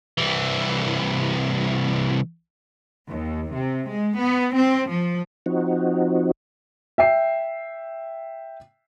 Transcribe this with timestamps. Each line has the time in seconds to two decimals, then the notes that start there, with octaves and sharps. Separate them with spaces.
0.18 C2 E3
3.08 D#2
3.54 C3
3.88 G#3
4.18 B3
4.55 C4
4.89 F3
5.46 F3 C4 D#4 F#4
6.98 E5 G5 C7